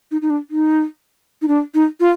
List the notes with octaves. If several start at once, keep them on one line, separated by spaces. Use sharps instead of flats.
D#4
D#4
D4
D#4
D#4
D4
D#4
F4